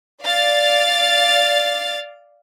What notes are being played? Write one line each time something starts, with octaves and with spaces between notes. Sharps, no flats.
D5 F5 A6